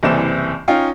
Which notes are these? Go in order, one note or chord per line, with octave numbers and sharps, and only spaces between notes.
F#1 C2 E3 C4 D5 E7
C#4 D#4 F4 F5 G5